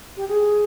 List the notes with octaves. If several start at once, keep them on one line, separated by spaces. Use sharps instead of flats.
G4
G#4